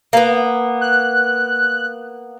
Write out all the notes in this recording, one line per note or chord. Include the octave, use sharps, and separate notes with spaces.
A#3 B3
F#6